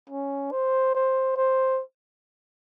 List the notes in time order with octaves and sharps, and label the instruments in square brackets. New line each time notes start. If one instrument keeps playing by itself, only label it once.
[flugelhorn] C#4
C5
C5
C5